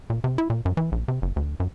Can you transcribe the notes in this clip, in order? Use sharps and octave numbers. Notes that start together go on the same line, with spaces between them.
A#2
C3
E4
A#2
F#2
E3
A#1
C3
F#1
D2
F#2